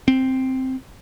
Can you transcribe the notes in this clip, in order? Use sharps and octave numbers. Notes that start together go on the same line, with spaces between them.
C4